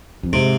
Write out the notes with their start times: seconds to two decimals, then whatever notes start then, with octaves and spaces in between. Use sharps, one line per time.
0.23 F2
0.33 G#2 C3